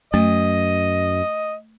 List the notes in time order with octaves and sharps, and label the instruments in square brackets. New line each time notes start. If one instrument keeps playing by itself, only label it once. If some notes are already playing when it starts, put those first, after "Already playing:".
[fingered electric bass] F#2 [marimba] A3 [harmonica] D#5